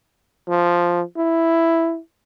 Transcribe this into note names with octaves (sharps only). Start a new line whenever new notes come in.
F3
E4